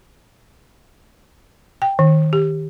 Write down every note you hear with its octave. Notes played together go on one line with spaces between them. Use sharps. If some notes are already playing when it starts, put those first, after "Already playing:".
G5
D#3
G4